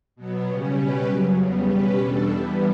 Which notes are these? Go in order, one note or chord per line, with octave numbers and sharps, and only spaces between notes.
B2 F#3 B3
C#3 G3 C#4
B2 G3 C#4 G4 B4
F#2 C#3 F#3
E2 C#3 G3 B3
B2 G3 C#4 G4 B4
E2 B2 G3 D4 A4
E3 G3 B3